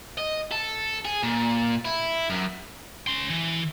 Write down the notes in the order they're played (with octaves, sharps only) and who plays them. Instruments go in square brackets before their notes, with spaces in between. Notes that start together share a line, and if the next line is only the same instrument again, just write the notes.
[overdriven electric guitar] D#5
A4
G#4
A#2
E4
F#2
[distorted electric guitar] C#4 C6
E3